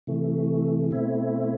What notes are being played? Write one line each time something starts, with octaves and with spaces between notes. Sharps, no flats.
C3 E3 A3
B2 A3 C4 E4